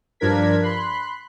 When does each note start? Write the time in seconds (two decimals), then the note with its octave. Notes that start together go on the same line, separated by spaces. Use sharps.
0.20 G2 F3 D4 A#4 G#6 B6
0.62 B5 C6 F#6